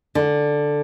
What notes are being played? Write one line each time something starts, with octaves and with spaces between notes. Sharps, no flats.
D3